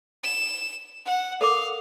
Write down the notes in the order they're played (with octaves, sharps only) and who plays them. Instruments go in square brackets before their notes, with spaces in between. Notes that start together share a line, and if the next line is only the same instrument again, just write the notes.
[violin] E7
F#5
[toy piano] A4 A#4 D6 [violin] F5